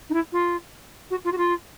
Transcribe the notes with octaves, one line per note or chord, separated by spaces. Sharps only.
D#4
E4
F4
F#4
F4
F#4
F4